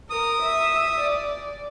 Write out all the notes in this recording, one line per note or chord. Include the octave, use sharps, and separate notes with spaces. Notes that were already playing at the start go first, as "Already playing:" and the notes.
A#4 D#6
E5
D5